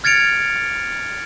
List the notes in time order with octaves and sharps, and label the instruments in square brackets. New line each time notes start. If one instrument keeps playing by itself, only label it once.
[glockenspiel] F6 G#6 A6 C#7 D7 F7